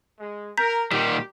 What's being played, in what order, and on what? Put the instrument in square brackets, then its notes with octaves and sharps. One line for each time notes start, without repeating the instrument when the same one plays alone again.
[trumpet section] G#3
[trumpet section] A#4 [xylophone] A#5 G6 B6
[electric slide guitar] A#2 D#3 G3 [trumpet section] G4 [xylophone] B6